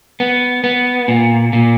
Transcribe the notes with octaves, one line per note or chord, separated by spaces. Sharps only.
B3
B3
A#2
A#2